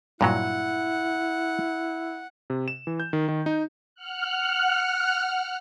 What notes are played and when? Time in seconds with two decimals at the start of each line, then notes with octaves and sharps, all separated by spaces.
0.21 G2 A#2 F#3 E4 F#5
2.50 C3
2.68 E7
2.87 E3
3.00 G6
3.13 D#3
3.28 D#3
3.46 D#4
3.95 F#5 F6 F#6